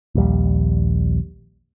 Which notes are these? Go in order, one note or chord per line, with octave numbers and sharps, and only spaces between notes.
A#1 D#2 G3